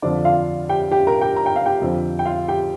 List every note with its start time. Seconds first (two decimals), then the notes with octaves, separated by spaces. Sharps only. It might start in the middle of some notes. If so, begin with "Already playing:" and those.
0.02 F2 D3 F3 D4 D5
0.25 F4 F5
0.69 G4 G5
0.91 G4 G5
1.07 A#4 A#5
1.21 G4 G5
1.36 A#5
1.46 G5
1.56 F5
1.66 G4 G5
1.82 F2 D3 F3
2.19 G5
2.25 F4 F5
2.48 G4 G5